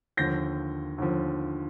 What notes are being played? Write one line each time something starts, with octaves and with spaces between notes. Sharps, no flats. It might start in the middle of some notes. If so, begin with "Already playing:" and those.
D#2 D3 F3 G6 A#6
D#2 D3 F3